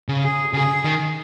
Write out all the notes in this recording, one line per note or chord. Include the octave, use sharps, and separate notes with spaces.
C#3
G#4
C#3 G#4
D#3